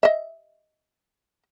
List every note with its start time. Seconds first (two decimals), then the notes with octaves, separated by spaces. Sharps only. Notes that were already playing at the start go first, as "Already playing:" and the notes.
0.03 D#5 E5